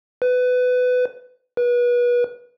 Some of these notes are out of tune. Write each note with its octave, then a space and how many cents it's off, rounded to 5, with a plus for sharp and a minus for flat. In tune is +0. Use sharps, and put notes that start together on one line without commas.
B4 +20
B4 -30